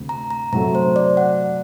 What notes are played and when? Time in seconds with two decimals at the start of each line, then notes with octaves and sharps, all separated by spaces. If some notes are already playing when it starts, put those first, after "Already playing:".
Already playing: D2 C3 A3
0.09 A#5
0.30 A#5
0.52 C3 F#3 A3 A#5
0.75 C5
0.96 D5
1.17 F#5